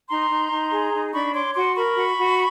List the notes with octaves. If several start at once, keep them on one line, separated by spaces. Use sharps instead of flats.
D#4 A#5 C6
D#4
D#4
G#4
D#4
D4 B5 C#6
C#5 C6 D6
F#4 C6 D6
A#4 B5 C#6
F#4
F#4